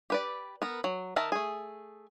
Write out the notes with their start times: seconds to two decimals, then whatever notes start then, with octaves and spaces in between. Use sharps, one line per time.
0.10 G4 B4 D5
0.62 B3 A#4
0.84 F#3
1.16 D#3 A#4 E5 A5
1.32 A3 G#4